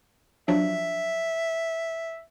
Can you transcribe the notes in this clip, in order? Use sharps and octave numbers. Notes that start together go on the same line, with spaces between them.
F3 F#3 D4 E5